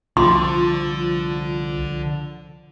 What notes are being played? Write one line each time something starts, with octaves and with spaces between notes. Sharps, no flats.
C2 D3 F3 C6